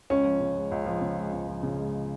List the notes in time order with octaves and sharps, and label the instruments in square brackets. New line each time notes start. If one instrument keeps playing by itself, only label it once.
[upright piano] C#2 [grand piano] C#4
[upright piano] F3
C#3
G#3
C#2
F3
C#3
G#3
C#2
F3
C#3
G#3